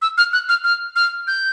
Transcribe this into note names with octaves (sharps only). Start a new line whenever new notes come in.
E6
F6
F#6
F6
F6
F6
G6